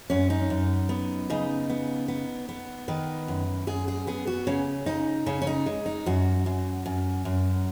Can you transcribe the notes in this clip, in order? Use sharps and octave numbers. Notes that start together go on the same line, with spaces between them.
F#2 C#4
D#4
F#2
B3
C#3 D#4
B3
B3
B3
D#3 B4
F#2
F#2 G#4
G#4
B3 G#4
F#4
C#3 C#4
C#3 D#4
C#3 C#4
C#4
D#4
G#3
D#4
F#2 F#4
F#2
F#2
F#2